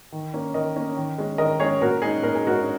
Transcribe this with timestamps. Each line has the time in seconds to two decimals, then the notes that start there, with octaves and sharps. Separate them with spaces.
0.12 D#3
0.34 A#3 C#4
0.54 D#3 A#4 D#5
0.76 A#3 C#4
0.97 D#3
1.18 G#3 C#4
1.38 D#3 A#4 D#5
1.60 G#3 C#4 G#4 C#5
1.81 A#2 F#4 A#4
2.02 G#3 C#4 D#4 G#4
2.23 A#2 A#4
2.35 G#4
2.45 G#3 C#4 F#4 A#4